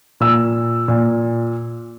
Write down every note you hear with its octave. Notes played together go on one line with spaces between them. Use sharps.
A#2 E6
A#2